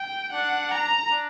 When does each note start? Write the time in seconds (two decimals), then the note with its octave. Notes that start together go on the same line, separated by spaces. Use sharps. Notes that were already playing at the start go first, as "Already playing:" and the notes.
Already playing: G5
0.33 D4 F#5
0.72 A#5
1.11 D4